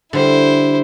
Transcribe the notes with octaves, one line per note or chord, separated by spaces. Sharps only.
D3 G3 E4 C5